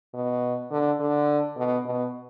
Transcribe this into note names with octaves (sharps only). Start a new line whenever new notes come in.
B2
D3
D3
B2
B2